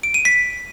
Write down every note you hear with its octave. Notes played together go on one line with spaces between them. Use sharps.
D7
D#7
B6